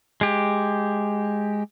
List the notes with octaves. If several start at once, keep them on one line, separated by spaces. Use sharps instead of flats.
G#3 G4